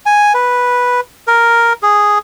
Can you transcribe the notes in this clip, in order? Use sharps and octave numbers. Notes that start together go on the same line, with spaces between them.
G#5
B4
A#4
G#4